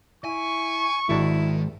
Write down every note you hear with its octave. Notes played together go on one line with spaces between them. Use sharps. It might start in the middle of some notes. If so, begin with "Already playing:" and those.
E4 G#5 C#6
G#1 D#3 D4 E4